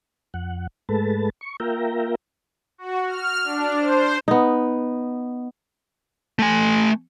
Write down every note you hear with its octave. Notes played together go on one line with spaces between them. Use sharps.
F2 F#5
G#2 G#3 A3 A4 B4 A5
C#6
A#3 F4 A#4 E5 G5 A#5
F#4
F6
D4
C5
B3 D#4
A3 G#5